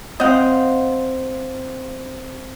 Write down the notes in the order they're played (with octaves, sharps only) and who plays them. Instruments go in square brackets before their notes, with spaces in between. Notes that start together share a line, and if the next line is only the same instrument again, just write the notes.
[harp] C4 F5 G6 [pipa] D#5 F#5